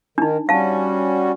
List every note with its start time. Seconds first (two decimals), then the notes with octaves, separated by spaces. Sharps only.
0.18 D#3 D4 D#4
0.49 G3 C#4 F#4 F5 A5